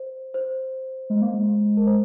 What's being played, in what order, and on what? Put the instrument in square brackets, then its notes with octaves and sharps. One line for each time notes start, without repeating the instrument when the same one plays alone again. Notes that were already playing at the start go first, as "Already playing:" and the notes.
Already playing: [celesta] C5
C5
[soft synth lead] G#3
A#3
G#3
[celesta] A#4
C5